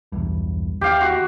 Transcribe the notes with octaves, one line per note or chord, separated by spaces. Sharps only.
B1 E2 G2
D#2 G4 F5
F#4